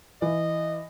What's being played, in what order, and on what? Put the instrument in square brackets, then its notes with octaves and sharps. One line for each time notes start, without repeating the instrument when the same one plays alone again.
[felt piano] E3 [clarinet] D#5